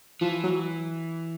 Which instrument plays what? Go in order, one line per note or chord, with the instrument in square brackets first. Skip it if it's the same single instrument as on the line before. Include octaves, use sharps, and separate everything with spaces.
[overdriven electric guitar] E3 [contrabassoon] F3
[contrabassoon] F#3